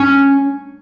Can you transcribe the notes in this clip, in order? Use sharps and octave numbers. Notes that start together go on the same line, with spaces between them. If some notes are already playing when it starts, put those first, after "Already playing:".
Already playing: C#4